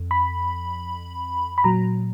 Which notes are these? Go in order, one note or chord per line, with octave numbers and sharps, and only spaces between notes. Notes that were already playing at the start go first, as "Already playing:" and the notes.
Already playing: F2
B5
B5
A#2 F#3 A#5